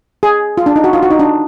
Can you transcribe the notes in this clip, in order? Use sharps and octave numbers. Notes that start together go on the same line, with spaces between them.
G#4
F4
D4
D#4
F#4
F4
F#4
D#4
D4